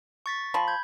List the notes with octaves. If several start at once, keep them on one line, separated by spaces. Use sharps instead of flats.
C#6 A6 B6
F3 B5
G6 G#6